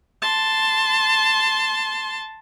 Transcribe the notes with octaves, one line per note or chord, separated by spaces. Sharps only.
A5 C6